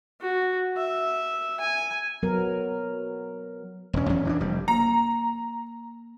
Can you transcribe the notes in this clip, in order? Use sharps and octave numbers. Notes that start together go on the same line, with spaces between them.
F#4
E5
G#5
F#3 B3 A#4
E1 C#4
E2 C#4
E3 C#4 D4
F1 G3
A#3 A#5